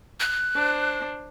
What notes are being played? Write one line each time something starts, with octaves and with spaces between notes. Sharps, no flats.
F#6
D4 C5